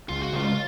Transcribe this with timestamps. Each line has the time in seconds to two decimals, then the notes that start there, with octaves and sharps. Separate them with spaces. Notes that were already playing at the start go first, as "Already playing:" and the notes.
0.09 C#2 F4
0.22 F#4
0.33 C#3 G#3 F4